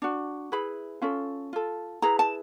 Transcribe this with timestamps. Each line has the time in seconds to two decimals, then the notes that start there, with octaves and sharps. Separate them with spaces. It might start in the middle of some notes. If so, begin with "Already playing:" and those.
0.02 D4 F#4
0.52 E4 G#4 B4 B5
1.02 C#4 F4 A4
1.53 F4 A4
2.02 E4 G#4 B4 A#5
2.19 A5